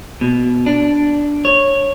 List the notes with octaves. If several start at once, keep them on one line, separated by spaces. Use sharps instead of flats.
B2
D4
C#5